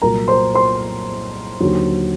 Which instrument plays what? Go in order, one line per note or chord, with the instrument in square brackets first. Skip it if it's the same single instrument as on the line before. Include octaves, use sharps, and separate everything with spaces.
[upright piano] C2 A#2 F#3 A#4 A#5
C5 C6
C5 C6
D#2 D3 F#3